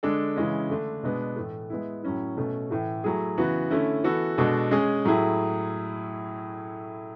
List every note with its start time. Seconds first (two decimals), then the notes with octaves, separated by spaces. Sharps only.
0.03 D3 G#3 D4 A4
0.36 C#3 E3 G#3 C#4
0.69 D3 A3 D4
1.03 B2 G#3 B3 D4
1.36 A2 E3 A3
1.70 G#3 B3 E4
2.03 A2 F#3 C#4 E4
2.37 B2 A3 C#4
2.70 A2 E3 A3
3.04 F#3 A3 E4 G#4
3.37 C#3 E3 B3 F#4
3.70 D3 A3 C#4 E4
4.04 E3 B3 F#4 A4
4.38 B2 G#3 D4 F#4 A4
4.71 G#3 C#4 G#4
5.05 A2 F#3 A3 E4 G#4